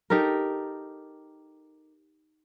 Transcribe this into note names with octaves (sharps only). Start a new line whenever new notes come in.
D#4 G4 A4 A#4